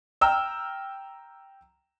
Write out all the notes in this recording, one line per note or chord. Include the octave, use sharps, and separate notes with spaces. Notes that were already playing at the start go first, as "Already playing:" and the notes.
G5 A#5 E6 F6